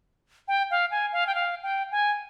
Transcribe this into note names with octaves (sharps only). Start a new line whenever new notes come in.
G5
F5
G#5
F5
G5
F5
G5
G#5